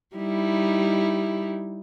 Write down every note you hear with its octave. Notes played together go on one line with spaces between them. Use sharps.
G3 D#4 E4